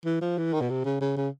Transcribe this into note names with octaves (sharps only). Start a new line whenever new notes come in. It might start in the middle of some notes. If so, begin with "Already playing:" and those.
E3
F3
E3
D#3
B2
C3
C#3
C#3
C#3